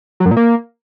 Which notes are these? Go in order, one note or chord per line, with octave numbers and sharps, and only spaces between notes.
F#3
F#2
A#2
A#3